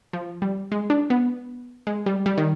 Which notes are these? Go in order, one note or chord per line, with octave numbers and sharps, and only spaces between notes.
F3
G3
G#3
D4
B3
G#3
G3
G3
D#3